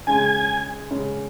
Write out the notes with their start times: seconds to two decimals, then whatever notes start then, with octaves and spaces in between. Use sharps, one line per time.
0.07 C#3 G#3 C#4 G#5
0.91 C#3 G#3 C#4